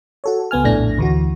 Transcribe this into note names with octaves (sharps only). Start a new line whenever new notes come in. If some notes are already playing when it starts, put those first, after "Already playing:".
F#4 A4 C#5
C#2 B3 G#5 F6
A#1 F2 A2 A3 D4 A#6
D2 E3 F#4